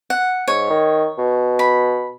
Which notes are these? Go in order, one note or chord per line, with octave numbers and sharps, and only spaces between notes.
F#5
G#2 C#5
D#3
B2
B5